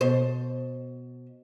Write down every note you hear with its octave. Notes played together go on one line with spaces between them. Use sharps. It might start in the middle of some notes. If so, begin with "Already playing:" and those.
B2 C5